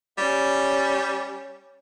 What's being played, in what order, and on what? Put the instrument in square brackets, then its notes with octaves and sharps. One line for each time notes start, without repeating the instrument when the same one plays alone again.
[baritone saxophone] G3 [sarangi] C#4